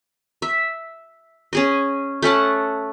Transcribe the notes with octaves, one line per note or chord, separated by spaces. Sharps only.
E5
C#4 G#4 D#5
A3 C#4 F#5 A5